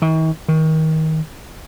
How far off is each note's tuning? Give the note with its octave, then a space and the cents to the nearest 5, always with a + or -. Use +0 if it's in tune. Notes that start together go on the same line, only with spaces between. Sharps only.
D#3 +45
D#3 +25